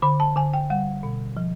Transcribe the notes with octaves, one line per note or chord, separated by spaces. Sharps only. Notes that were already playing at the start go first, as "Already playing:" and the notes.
D3 B5
A5
D3 G#5
G5
G3 F#5
B2
F3